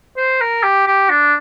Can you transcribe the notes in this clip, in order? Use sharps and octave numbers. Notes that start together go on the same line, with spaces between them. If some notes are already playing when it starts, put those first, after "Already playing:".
C5
A#4
G4
G4
D4